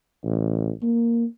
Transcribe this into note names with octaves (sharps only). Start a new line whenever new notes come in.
A1
A#3